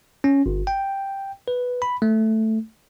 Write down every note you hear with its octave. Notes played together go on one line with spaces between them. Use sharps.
C#4
G1
G5
B4
B5
A3